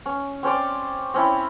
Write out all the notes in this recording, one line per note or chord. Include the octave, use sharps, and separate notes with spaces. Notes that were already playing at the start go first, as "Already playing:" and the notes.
C#4
C4 C#4 C5 D5
C4 C#4 E4